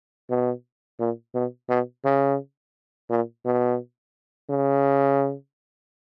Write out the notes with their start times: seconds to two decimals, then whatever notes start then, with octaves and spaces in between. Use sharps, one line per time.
0.30 B2
1.00 A#2
1.35 B2
1.69 B2
2.05 C#3
3.10 A#2
3.46 B2
4.50 C#3